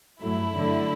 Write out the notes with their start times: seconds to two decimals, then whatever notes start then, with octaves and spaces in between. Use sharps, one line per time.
0.22 G2 F#3 A3 E4
0.54 G2 D3 F#3 A3